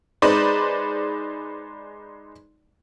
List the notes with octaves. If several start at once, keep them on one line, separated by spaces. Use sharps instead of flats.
G#3 D#4 B4 C5 D5